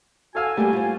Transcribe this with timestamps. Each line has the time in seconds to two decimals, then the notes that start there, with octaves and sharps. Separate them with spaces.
0.35 F#4 A4 F5 G#5 E6
0.57 G3 A3 A#3 G5
0.73 F4 C5